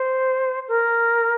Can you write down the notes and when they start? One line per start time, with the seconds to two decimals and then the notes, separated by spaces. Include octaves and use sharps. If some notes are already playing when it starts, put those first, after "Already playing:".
Already playing: C5
0.68 A#4